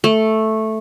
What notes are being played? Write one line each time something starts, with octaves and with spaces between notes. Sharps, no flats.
A3